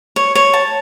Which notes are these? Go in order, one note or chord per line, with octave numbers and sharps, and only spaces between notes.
C#5
C#5
A5